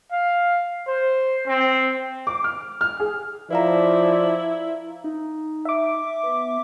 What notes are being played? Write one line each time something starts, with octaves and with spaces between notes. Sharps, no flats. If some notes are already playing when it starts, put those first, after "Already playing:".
F5
C5
C4
D6
F6
F6
G#4
F3 E4 B4 D5 F5 A#5
D#4
E5 D6
B3